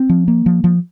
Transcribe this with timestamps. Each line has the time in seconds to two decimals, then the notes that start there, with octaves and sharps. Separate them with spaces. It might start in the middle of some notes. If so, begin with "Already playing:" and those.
Already playing: C4
0.09 F3
0.28 A#3
0.46 F3
0.64 F3